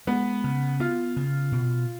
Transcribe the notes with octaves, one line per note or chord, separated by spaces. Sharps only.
G#3 B3
C#3
B3 F4
C#3
B2